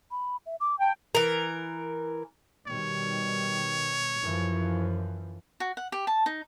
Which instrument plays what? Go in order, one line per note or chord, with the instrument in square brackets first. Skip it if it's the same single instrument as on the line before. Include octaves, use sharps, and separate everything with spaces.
[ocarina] B5
E5
D6
[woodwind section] G5 [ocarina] A5
[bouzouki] E3 A#4
[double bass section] B2 D#3 G3 [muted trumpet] C#5
[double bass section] F#2 E3 F3
[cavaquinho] F#4
F#5
G4
A5
D#4